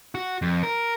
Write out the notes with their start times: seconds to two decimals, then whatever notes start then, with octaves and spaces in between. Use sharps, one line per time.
0.15 F#4
0.42 F2
0.63 A#4